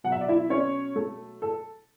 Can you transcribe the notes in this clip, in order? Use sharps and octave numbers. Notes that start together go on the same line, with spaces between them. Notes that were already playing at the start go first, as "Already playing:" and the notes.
B2 F#3 F#5
E5
D5
E4 E5
C#4 C#5
A3 A4
A4